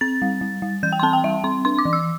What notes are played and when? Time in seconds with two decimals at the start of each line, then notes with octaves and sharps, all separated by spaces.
0.01 C4 A6
0.22 G3
0.41 G3
0.62 G3
0.83 E3 G6
0.92 G5
0.99 C6
1.03 C4 A5
1.13 G5
1.24 G3 E5
1.44 C4 C6
1.65 D4 C6
1.78 D6
1.85 E3
1.93 E6